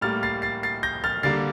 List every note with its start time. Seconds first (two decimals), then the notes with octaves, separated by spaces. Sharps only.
0.01 A2 G3 A#3 F6 A6
0.23 A6 C7
0.42 A6 C7
0.63 A6 C7
0.83 G6 A#6
1.04 F6 A6
1.23 D3 G3 A#3 A6 C7